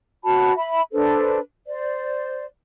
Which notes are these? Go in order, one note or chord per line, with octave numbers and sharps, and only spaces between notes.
F#4 C#5 A5 B5
E5 B5
D4 A4 B4 C5
C5 D5